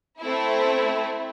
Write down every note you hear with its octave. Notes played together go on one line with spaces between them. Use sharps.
A3 C4 E4